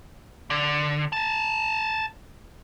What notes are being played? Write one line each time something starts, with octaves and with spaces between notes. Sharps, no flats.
D3
G#5 A5